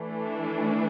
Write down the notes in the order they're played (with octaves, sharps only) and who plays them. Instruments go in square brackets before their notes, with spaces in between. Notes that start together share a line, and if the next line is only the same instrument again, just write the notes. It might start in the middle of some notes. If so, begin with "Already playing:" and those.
Already playing: [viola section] E3 A3 D4